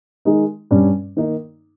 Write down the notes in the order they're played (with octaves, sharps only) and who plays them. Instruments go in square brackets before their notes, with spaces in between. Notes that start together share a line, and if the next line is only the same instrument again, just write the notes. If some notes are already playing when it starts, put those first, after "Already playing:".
[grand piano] D#3 G#3 D#4
G2 G3 C#4
D#3 A#3 D#4